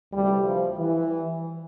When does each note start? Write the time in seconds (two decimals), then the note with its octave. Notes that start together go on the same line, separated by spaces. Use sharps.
0.12 D2 C3 E3 G3
0.44 F3
0.78 E3